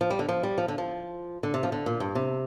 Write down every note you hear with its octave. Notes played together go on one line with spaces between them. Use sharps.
F3
G3
D3
F3
G3
F3
D3
F3
D3
C3
F3
D3
A#2
G2
C3